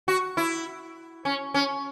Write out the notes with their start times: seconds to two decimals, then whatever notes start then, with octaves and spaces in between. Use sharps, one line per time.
0.08 F#4
0.37 E4
1.25 C#4
1.54 C#4